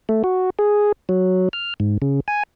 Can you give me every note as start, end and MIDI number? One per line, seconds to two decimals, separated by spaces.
0.09 0.23 57
0.24 0.50 66
0.59 0.92 68
1.09 1.49 54
1.53 1.74 89
1.80 1.98 44
2.02 2.20 49
2.28 2.43 80